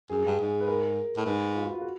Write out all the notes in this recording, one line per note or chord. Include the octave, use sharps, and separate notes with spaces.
F#2 G#4
G2
G#2
B4
A#4
A2
G#2 B4
F4
F#4
F4
F#4